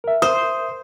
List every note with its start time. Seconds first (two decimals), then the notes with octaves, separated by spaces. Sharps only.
0.04 A#4 E5
0.22 C5 D#6